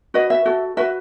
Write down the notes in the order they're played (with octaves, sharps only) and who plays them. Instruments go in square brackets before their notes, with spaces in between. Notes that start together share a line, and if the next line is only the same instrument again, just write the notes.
[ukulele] F#4 B4 D#5
E5
F#4 A4
F#4 B4 E5